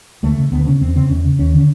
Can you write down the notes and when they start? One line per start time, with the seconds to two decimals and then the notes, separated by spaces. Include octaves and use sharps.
0.23 D2 A3
0.37 C#3
0.52 D2 B3
0.66 C#3 C#4
0.81 E2 C4
0.95 C#3 C4
1.10 E2 C#4
1.25 C#3
1.39 D#2 C#4
1.53 D3
1.58 C#4